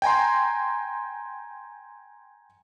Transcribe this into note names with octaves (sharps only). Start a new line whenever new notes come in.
G5 G#5 A#5 C6